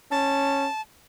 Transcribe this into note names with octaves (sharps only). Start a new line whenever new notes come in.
C#4 A5